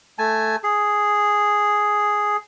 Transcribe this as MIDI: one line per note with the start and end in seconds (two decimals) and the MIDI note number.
0.19 0.56 57
0.19 0.56 80
0.19 0.56 81
0.64 2.37 68